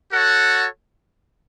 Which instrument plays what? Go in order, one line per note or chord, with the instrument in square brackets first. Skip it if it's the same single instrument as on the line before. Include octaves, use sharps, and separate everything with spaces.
[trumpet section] F#4 A4 C#5 F#5